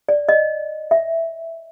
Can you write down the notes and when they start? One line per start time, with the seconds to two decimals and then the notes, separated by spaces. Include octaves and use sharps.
0.09 D5
0.29 D#5
0.91 E5